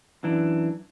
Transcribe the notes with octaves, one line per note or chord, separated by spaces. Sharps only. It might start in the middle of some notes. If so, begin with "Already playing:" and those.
F#2 E3 D4